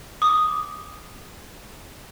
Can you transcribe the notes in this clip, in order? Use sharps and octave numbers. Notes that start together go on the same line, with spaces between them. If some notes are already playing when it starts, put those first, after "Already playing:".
D6 D#6